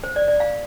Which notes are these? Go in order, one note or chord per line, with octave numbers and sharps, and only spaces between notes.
C5
D5
D5
F5